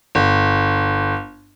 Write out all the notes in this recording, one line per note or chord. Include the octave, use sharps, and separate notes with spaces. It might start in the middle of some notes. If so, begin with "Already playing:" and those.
G1